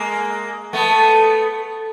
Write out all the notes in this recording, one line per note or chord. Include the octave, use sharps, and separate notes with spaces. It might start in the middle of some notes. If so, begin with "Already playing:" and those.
Already playing: G#3 A#3
A3 B3